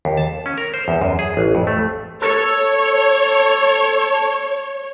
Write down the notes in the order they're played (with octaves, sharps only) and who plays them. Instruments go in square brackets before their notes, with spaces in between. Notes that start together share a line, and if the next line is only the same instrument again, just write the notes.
[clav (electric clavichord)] D#2
A5
C#4
A#4
C5
E2
F#2
G#4
A1
F2
A3
[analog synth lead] A4 [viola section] C#5